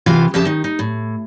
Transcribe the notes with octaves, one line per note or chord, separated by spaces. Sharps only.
C3 E3 F4 F#4 F5
F2 C#3 G4 E5 A5
D#3 D#4
D#4
A2